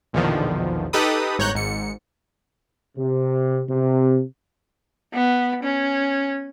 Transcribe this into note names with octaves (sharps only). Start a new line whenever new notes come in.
A#1 E2 B2 D3 D#3 F3
D#4 G4 A4 B4 B5 D#6
G1 G#2 C#5 A#5 F#6 G6
G#1 G#2 C#7
C3
C3
B3
C#4